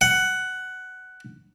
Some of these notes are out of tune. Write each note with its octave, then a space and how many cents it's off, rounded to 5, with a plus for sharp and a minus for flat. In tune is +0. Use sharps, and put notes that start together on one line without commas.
F#5 +10